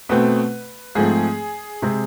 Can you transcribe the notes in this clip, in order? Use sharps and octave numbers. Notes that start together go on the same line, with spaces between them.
B2 A3 C4 B4
G#2 F3 A3 C4 G#4
C3 G#3 C4